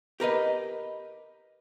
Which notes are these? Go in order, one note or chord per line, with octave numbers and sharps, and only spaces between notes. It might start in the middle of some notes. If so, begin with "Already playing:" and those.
G4 A#4 B4 D#5